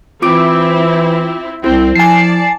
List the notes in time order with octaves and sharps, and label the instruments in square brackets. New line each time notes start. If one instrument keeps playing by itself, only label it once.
[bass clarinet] E3 [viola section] C4 E4 [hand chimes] F4 D6 D7
[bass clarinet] C2 [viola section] C4 [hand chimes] E4
[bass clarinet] F3 [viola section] D5 A5 [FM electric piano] G#5 C7